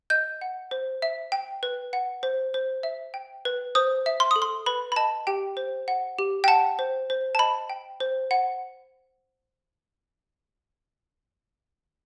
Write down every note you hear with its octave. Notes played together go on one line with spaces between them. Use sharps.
D#5 G6
F#5
C5
E5
G5
B4
F#5
C5
C5
E5
G5
B4
C5 D#6
E5
C6
A4 D#6
C6
B4 B5
B5
D#5 A5
G4 G5
C5
F#5
G4
G5
F#5 A5
C5
C5
A5
D#5 B5
G5
C5
F#5